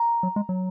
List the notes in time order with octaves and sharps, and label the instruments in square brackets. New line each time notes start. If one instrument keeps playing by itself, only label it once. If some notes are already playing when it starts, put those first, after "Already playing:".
Already playing: [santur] A#5
[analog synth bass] F#3
G#3
F#3